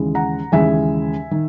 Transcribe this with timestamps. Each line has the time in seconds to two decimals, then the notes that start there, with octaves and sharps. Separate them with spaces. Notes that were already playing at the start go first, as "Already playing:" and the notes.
Already playing: D#2 C#3 E3 G#3
0.15 F#5 A#5
0.52 D#2 C#3 E3 G#3 E5 G#5
1.31 D#3